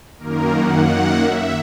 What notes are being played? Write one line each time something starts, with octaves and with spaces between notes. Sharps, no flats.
F#2 D#3 A#3 A#4
F#5
F#5
E5